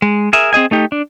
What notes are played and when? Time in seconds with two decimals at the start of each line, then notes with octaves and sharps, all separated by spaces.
0.02 G#3
0.33 G#4 A#4 E5
0.53 C4 G#4 D#5 G#5
0.71 A3 D#4 G4
0.92 D4